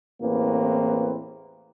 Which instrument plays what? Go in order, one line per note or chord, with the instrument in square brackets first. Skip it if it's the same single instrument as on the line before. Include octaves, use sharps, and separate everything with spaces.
[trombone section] A1 E2 A#3 C4 B4